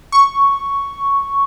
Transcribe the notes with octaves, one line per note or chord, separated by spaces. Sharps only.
C#6